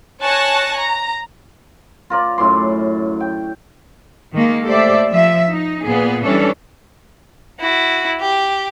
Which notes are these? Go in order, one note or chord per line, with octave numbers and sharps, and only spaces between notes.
C#5 G#5 A5 C#6 F#6 A#6
A#5
F4 A#4 D5
F#2 A2 D5 C6
G5
D#3 G#3 A#3
A3 G4 A4 C5 D5 E5
F3 E5
D#4
A#2 B3 G#4
E3 G3 C#4 D4 A4 C#5
E4 F#4
G4